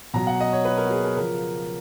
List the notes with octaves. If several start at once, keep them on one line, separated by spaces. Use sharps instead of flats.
B2 F#3 A#5
F#5
D#5
C#5
B4
A#4
F#4
G#4
A#4
C#3 F3 A#4